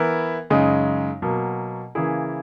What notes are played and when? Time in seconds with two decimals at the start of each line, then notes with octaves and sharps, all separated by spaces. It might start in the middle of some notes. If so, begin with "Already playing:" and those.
Already playing: E3 B3 E4 A#4
0.50 F#2 C#3 G#3 D#4
1.22 B2 F#3 A#3
1.95 C#3 E3 A#3 E4 G#4